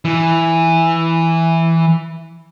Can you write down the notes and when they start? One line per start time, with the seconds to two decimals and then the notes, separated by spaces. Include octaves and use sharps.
0.05 E3